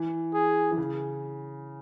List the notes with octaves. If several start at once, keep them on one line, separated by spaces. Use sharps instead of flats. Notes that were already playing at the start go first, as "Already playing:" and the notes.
Already playing: E3
G#4
E3
C#3